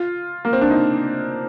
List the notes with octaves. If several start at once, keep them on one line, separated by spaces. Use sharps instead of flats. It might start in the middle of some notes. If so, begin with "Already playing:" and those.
Already playing: F4
A#3
C4
D4
D#4